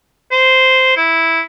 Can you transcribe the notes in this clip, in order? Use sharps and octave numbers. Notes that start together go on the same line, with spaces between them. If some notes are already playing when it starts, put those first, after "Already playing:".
C5
E4